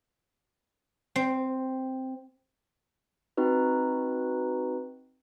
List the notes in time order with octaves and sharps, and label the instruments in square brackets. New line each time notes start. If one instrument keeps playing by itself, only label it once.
[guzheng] C4
[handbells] C4 D#4 F#4 B4